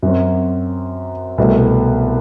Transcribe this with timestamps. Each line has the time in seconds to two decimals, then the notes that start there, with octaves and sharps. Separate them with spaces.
0.02 F#2 F#3 C4
1.38 C2 B2 A3 C4